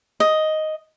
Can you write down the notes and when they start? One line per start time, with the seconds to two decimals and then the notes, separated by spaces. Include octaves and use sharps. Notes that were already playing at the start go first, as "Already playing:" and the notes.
0.20 D#5